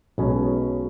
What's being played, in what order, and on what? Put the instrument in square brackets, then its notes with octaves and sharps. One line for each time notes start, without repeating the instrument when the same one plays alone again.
[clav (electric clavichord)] B1 B2 G#3 C#4